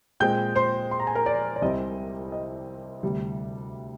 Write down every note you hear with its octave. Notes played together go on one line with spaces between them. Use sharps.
A#2 G#3 C4 G5 G6
C5 C6
C6
A#5
G#5
A#4 A#5
D5
D5
C2 C3 G3 C4 D#5
D#5
D2 C3 G3